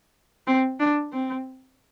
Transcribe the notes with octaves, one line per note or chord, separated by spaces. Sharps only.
C4
D4
C4